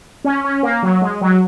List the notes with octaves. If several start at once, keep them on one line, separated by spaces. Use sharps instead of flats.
C#4
C#4
A#3
F#3
G#3
F#3